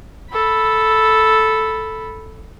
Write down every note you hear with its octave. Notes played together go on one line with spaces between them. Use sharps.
A4 B5